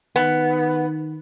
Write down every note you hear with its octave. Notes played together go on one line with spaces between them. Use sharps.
D#3 B3